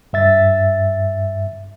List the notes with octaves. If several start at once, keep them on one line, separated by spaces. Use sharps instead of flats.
G2 E5 A6